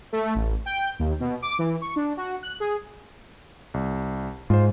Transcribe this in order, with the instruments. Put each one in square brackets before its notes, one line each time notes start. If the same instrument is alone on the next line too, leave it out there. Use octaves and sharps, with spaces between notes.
[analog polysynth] A3
A1
G5
D#2
B2
D6
E3
C#6
D4
F#4
F#6
G#4
[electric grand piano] C2
[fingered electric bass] G#2 [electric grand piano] F4 C5